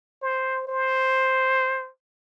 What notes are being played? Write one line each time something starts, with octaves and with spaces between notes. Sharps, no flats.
C5
C5